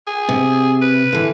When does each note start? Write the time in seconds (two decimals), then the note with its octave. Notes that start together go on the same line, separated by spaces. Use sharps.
0.07 G#4
0.29 C3
0.81 B4
1.13 D3 E3